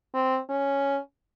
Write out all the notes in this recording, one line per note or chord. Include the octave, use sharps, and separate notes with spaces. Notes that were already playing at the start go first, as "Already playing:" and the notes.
C4
C#4